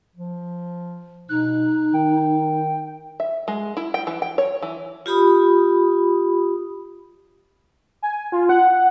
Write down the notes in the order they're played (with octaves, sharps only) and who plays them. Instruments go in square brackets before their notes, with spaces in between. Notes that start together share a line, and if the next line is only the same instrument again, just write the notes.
[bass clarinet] F3
[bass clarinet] B2 [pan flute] D#4 [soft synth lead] F#6
[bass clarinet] D#3 [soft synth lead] G5
[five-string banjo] E5
G#3
E4
G5
E3
G5
C#5
E3
[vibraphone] F4 G4 B5 D#6
[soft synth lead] G#5
F4
F#5